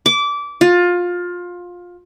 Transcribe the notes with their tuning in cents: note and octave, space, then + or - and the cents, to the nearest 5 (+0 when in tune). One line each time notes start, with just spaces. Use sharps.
D6 -20
F4 +20